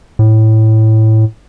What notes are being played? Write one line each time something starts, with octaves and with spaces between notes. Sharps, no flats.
A2